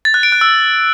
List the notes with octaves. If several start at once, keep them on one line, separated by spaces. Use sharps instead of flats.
A6
F#6
D7
F#6
E6